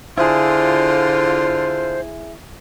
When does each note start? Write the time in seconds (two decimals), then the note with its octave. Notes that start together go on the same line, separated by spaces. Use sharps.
0.18 D3 E4 F4 G#4 C5